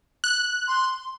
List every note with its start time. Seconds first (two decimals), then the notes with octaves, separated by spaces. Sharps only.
0.24 F#6
0.68 C6